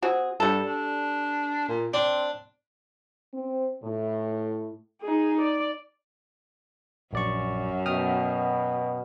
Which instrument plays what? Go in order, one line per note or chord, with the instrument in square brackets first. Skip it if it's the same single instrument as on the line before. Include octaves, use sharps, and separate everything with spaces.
[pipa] C4 F#4 G#4
[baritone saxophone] G2 [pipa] G3 A4
[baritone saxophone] D4
A#2
[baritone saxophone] C4 [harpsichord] D4
[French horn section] C4
A2
[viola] D#4 G#4
D5
[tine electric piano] A#1 D5 C#6 [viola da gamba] F#2
[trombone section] B2 [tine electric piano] G5 D#6 F6